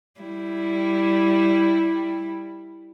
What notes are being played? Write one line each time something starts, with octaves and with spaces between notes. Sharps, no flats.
G3 E4